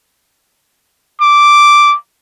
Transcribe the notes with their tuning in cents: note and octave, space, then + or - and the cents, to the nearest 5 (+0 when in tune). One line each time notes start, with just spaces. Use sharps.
D6 +0